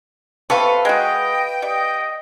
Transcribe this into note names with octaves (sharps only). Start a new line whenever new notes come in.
C3 A4 B4 C5 F5 C#6
G#3 F#4 D#5 G5
G3 D#5